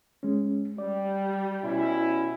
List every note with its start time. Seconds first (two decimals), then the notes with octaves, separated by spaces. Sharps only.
0.23 G#3 C#4
0.78 G3 D5
1.64 B2 C#4 E4